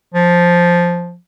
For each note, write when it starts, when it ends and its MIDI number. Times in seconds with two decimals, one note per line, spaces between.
0.15 1.16 53